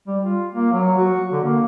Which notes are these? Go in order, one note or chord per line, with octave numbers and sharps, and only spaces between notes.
G3
F4
A#3
F#3
F#4
D3
A#3